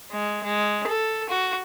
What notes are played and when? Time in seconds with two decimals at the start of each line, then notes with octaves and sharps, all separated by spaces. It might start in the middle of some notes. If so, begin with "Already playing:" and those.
0.12 G#3
0.43 G#3
0.88 A4
1.29 F#4